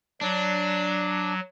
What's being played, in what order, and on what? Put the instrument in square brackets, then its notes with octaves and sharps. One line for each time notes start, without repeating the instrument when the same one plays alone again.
[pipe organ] F#3 [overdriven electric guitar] D4